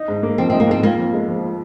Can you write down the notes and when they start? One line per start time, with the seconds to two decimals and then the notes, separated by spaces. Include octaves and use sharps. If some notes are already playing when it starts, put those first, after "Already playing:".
Already playing: D#4
0.08 G#2
0.23 A#3
0.38 F3 C4
0.50 C4 D#4
0.60 A#3
0.68 G#2 C4
0.83 A#3 F4
0.98 F2
1.14 G#3
1.28 F3
1.44 F4